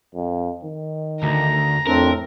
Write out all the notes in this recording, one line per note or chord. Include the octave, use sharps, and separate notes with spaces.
F2
D#3
D2 A#5
F2 A2 C4 D4 A#4